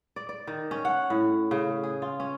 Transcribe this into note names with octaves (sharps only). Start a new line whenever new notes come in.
D5
D5
D#3
C#4
F#5
A2
C#3
G#4
F4
C#4